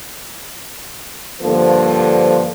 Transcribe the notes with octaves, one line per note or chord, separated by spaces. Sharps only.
G2 D3 F3 A#3 A4 C5